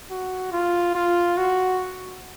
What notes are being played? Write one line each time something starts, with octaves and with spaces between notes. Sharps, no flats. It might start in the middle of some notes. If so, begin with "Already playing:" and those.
F#4
F4
F4
F#4